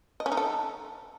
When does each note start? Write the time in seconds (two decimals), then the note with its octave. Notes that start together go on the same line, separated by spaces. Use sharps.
0.20 D#5
0.26 C#4
0.32 D#4
0.37 A4